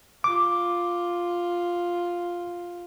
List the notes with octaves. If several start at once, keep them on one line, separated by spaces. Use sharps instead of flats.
F4 D6